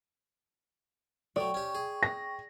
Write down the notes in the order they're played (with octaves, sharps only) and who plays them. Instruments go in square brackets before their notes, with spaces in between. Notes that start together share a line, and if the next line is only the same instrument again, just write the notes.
[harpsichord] F#3 A3 [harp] D5 [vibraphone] G5 C#6
[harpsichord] C#4 G4
G#4
[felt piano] A#6